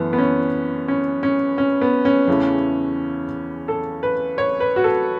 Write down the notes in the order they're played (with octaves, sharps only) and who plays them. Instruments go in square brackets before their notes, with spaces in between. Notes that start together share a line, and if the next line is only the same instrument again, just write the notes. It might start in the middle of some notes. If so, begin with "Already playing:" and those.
Already playing: [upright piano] F#2 E3 A3 B3
B3
C#4
C#4
C#4
C#4
B3
C#4
E2 C#3 E3 A3
A4
B4
C#5
B4
F#4
A4